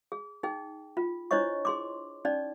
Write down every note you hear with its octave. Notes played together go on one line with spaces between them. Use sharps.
G#4
D#4 G#4 G5
F4
D4 E4 C5 C#5 D#5 C#6
G#4 C6 D6
C#4 D#4 D5